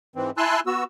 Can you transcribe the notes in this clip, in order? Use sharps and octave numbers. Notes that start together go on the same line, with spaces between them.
G#2 E3 C4
E4 G#5 A5 C6 E6 F#6
B3 F#4 E6